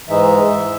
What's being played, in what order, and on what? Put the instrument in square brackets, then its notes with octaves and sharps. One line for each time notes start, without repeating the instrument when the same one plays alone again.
[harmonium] G#2 E3 G#3 D#4 E5